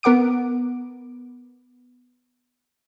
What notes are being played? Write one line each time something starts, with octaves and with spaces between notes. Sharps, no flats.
B3 A#4 F#5 D6 D7